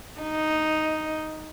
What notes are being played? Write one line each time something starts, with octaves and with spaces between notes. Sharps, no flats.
D#4